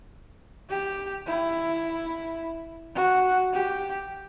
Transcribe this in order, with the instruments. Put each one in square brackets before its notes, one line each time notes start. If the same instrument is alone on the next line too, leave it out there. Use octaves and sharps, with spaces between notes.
[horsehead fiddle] G4
E4
F#4
G4